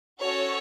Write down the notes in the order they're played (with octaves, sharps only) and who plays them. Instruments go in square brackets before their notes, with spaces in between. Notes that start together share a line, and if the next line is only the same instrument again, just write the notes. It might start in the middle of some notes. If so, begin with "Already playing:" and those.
[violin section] C#4 F#4 A4 C#5